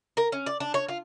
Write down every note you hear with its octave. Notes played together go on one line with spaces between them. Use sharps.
A#4
C#4
D5
D4
C#5
F4